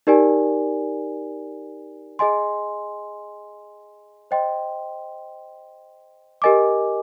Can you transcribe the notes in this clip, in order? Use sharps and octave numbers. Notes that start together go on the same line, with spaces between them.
D#4 G4 A#4 D5 G#5
G#4 D#5 G#5 C6
C5 D#5 G5 C6
G4 A#4 D#5 G#5 D6